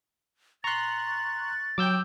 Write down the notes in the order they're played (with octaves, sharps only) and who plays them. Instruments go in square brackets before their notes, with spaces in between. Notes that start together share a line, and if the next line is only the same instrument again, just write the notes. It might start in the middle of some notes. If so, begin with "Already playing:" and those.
[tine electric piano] A#5 C6 [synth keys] C#6 F#6 [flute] A6
[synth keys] F#3 G5 [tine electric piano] D6 E6 G6